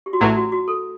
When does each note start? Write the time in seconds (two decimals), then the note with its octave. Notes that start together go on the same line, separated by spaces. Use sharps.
0.06 G4
0.13 F#4
0.20 A1 A2 F#3 E4
0.36 F#4
0.52 F#4
0.68 A4